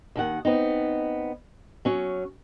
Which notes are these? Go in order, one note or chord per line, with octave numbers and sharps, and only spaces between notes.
D#2 D#3 F#5
B3 C4 D#4
F#3 C#4